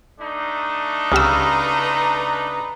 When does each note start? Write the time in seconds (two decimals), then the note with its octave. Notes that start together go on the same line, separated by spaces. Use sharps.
0.20 A3 D4 D#4
1.12 C#2 C#3 G4 B4 A#5 E6